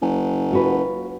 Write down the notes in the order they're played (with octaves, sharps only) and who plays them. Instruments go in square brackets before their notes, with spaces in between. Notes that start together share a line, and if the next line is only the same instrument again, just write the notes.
[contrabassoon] F#1
[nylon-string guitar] F4 F#4 B4